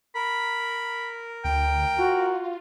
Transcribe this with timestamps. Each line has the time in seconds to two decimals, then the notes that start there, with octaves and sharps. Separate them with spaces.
0.15 A#4 B5
1.45 D2 G5
1.98 F4 F#4